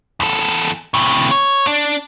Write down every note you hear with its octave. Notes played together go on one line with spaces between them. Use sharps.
E2 A4
A2 C3
C#5
D4